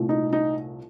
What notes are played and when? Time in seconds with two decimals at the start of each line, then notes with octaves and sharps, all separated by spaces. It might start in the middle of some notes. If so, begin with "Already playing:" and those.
Already playing: C2 A#2 A3
0.09 D#4
0.33 D#4